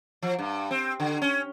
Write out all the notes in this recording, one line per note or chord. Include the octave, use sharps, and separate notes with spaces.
F3
G2
C4
D3
C#4